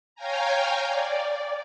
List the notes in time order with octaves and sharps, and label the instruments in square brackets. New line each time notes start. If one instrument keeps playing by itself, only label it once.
[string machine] C#5 F5 G5 G#5 A#5
D5